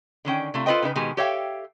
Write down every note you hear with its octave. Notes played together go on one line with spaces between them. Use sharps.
D3 D#3 C#4 G5
C3 A3 F4
F4 A4 B4 C5 D#5 G5
C#3 D#4 E4 B4
B2 D#3 G#3 G4 G#5
G4 A4 C#5 E5 F5 G5